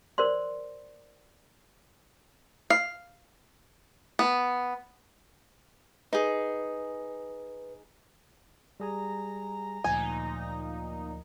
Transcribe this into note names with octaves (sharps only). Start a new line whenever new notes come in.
A#4 C5 D5 C6
F5
B3
D#4 G#4 B4
G3 G#4 G#5 A#5
D2 A#2 F3 D#4 G#5